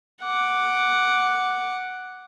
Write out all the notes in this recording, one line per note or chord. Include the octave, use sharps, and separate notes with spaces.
F#5 D6